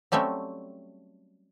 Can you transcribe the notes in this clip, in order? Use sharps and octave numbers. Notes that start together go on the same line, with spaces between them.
F#3 G3 A3 C4 C#4